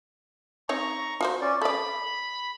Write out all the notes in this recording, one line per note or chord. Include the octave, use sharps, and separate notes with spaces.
C4 D#4 C#5 A#5 C#6
F4 F#4 C5
C#4 D5
A4 D5 B5